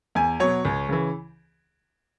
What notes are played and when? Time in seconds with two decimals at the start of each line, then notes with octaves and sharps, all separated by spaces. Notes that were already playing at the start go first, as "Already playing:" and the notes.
0.15 E2 G#5
0.40 B2 F#3 C#5
0.65 C#2
0.89 C#3 E3